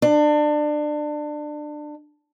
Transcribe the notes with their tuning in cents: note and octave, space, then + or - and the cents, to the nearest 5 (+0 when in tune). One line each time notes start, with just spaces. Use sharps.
D4 +25